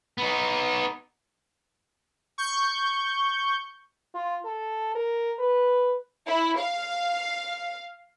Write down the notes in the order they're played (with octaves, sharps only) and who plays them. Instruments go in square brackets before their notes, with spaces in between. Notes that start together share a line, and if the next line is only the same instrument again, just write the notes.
[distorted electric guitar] B3 D#4
[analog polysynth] C#6 G6
[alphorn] F4
A4
A#4
B4
[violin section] E4
F5